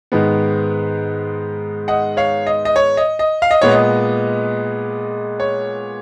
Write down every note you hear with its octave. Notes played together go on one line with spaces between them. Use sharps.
G#2 D#3 G#3 B3
D#5 F#5
C#5 F5
D#5
D#5
C#5
D#5
D#5
F5
D#5
A#2 G#3 B3 C#5
D#5
C#5